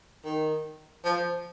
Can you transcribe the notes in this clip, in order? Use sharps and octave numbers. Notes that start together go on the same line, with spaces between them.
D#3
F3